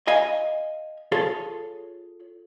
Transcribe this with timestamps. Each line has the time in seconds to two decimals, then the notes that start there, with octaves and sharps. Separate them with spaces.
0.07 D#5 F5 G#5
1.12 F4 G#4 A4 C#5